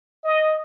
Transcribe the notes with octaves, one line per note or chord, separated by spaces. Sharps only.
D#5